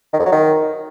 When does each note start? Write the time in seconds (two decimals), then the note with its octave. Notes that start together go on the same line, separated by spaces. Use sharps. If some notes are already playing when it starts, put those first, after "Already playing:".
0.13 D#3
0.19 F2
0.26 F#3
0.32 D#3